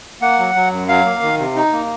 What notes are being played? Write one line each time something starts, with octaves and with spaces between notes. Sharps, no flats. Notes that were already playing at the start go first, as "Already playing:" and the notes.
A#3 F#5
F#3
F#3
F#2
F#3 F5
A#3
D#3
C3
D#4
A#3